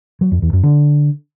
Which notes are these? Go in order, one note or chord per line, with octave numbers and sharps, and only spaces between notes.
F#3
F2
E2
F#2
D3